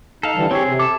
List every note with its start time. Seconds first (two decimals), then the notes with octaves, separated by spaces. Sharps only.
0.23 D#4 A4 F5
0.35 D3 E3 G3
0.51 C4 G4 G#4 C#5
0.67 C3
0.79 A4 D6